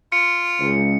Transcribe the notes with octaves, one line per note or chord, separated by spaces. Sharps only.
F4 C#7
C#2